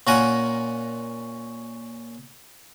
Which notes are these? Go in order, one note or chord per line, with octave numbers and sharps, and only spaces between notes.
A#2 C#4 A#4 F#5 G#5